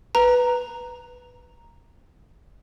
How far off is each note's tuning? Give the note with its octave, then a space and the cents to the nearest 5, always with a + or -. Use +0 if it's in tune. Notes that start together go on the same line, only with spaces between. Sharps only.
B4 +0 A#5 +0